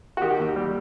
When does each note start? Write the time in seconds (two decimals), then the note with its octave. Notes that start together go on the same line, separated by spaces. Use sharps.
0.17 F#4
0.22 D#3 G4
0.39 D#2
0.56 G3